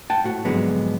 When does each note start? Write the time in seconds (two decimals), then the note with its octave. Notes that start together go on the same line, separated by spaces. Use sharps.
0.10 F#5 G5 A5
0.24 A2 F#4
0.45 F2 G#2 D3 F#3 G#3 B3